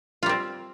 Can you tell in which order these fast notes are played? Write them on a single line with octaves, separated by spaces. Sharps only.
F4 G3 C4